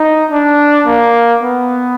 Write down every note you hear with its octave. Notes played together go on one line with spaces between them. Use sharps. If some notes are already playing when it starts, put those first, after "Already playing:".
Already playing: D#4
D4
A#3
B3